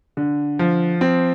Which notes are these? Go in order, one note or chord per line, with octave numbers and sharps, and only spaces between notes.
D3
F3
C4